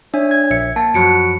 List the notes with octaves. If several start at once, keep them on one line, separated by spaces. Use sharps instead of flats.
D4 C#5 E5 G#5
G#6
A#1 E5 C#7
A#3 A5
F#2 F3 F#3 F#4 B5 C#7 D7